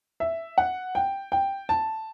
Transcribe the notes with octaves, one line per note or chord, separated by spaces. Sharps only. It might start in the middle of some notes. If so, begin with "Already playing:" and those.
E5
F#5
G5
G5
A5